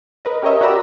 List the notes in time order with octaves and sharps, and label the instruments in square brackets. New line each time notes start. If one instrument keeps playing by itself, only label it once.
[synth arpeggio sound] A#4 B4 D#5
C#4 G4 A#4 C#5 D#5 E5
F#4 G4 D5 A#5 B5 E6